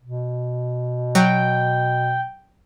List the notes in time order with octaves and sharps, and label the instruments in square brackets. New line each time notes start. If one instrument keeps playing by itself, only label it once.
[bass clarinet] B2
[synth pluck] F#3 [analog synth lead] G5